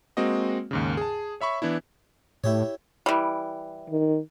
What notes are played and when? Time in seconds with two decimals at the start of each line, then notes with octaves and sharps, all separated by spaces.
0.17 G#3 A#3 C4 F#4 D#5
0.71 D#2 G#2 C#3
0.97 G#4 A5
1.41 C#5 E5 B5 C#6
1.62 E3 B3 D4 E4
2.44 A2 E4 G4 C#5
3.06 E3 G3
3.90 D#3